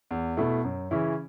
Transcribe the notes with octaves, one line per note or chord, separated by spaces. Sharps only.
E2
B2 A3 E4
F#2
C#3 E3 C#4 E4